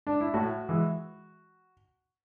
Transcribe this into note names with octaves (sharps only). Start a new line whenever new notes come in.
D4
E4
A2 F#4
E3 G#3